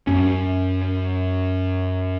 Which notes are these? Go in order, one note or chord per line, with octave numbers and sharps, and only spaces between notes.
F#2 C#4